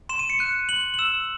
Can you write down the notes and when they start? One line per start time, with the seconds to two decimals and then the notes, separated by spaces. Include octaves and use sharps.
0.09 C6 E7
0.19 D#7
0.30 C#7
0.39 F#6 D#7
0.69 C6 F#7
0.94 F#7
0.99 E6 E7